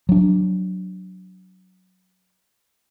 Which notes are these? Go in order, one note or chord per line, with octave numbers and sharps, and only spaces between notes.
F#3 D4